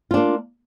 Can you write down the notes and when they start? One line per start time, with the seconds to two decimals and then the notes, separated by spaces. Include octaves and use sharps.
0.11 F4
0.14 D4
0.17 A#3